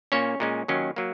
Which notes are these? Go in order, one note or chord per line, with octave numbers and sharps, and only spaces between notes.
A#2 A#3 C#4 C#5
A#2 G#3 C#4
D#2 D#3 F#3 C#4
F#3 A#3